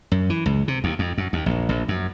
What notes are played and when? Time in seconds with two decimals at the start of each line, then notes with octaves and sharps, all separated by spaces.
0.12 F#2
0.30 E3
0.46 C#2
0.68 C3
0.84 D#2
0.99 F2
1.18 F#2
1.33 D#2
1.46 A#1
1.69 A#1
1.88 F#2